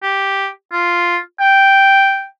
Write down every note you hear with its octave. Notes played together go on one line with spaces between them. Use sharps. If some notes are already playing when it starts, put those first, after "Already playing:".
G4
F4
G5